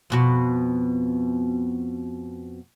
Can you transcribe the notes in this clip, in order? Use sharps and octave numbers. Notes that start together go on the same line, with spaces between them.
F2 B2 F#4